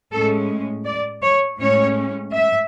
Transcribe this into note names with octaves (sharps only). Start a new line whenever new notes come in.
A2 G#3 C#4 A4
D5
C#5
A2 G#3 C#4 C#5
E5